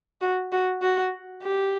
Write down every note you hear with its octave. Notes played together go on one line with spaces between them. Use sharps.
F#4
F#4
F#4
G4